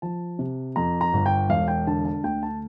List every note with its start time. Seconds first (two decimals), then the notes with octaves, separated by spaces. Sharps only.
0.02 F3 A5
0.39 C3
0.76 F2 A#5
1.01 A#5
1.13 G1
1.26 G5
1.49 E1 F5
1.68 G5
1.87 D3 A5
2.05 A5
2.23 D2 G5
2.43 A5